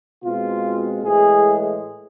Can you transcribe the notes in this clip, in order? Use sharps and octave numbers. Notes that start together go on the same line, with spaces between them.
B2 G#3 C4 F4
A2 E3 G#3 G#4